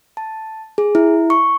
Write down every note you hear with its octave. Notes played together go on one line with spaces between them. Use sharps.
A5
G#4
E4
C#6